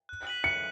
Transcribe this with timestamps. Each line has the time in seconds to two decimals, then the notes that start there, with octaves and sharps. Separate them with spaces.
0.09 F#6
0.27 B6 D#7 F#7
0.43 F#6 C#7